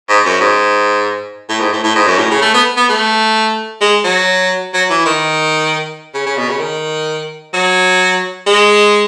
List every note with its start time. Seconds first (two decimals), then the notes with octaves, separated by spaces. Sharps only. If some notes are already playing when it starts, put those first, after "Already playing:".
0.09 G#2
0.25 F#2
0.40 G#2
1.49 A2
1.60 G#2
1.73 A2
1.84 A2
1.96 G#2
2.07 F#2
2.18 A2
2.30 C#3
2.42 A3
2.54 B3
2.77 B3
2.89 A3
3.81 G#3
4.04 F#3
4.74 F#3
4.90 E3
5.05 D#3
6.14 C#3
6.26 C#3
6.37 B2
6.49 C#3
6.60 D#3
7.53 F#3
8.46 G#3